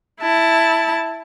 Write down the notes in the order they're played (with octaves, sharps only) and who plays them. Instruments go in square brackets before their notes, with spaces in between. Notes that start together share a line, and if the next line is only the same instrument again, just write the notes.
[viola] E4 A5